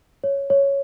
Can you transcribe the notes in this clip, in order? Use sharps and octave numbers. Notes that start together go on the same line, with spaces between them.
C#5
C#5